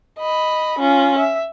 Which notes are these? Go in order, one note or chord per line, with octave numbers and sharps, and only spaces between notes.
D#5 B5
C#4 F4
E5